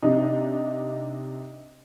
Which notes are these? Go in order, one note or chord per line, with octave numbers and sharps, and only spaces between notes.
C3 D4 D#4